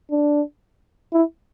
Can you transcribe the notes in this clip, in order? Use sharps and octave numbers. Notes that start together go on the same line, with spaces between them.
D4
E4